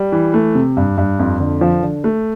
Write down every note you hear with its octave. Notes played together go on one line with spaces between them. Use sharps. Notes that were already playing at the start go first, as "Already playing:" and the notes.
Already playing: G3
E3
A3
C3
G2
G2
F2
D3
F3
D3
A3